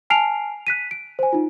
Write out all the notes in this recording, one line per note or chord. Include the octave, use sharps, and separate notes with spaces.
G#5 A5 F6 C7 D7 F7
F#6 B6 D#7
D7
C5 G#5
D#4 F4